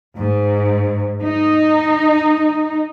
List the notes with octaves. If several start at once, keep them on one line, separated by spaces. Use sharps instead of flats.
G#2
D#4